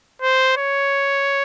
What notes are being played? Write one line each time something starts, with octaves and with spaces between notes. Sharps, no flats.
C5
C#5